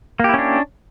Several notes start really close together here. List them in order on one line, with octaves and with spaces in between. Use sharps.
A#3 G4 E4 C#4 D4